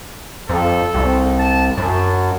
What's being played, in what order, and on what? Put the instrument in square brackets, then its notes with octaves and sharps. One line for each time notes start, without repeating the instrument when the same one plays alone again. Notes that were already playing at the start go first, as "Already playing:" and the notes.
[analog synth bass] F2 [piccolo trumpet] A4
[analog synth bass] C2
[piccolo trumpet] A5
[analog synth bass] F#2 [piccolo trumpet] A5